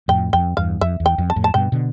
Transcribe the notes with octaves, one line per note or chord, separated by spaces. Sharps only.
F2 A2 G5
F2 G5
E2 G2 F5
F2 E5
E2
G5
F2
A5
F2 A2
A5
G2 B2 G5
B2 D3